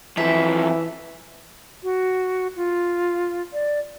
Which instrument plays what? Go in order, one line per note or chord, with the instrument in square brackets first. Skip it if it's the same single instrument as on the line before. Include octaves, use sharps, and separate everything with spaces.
[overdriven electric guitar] F#2 F3 [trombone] E3 [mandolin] E5
[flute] F#4
F4
D5